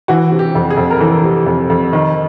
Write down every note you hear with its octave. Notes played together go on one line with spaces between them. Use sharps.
E3 F#4
C3
G4
F2
G#4
F2
A#4
E3 A4
C3
F2
F2
D#3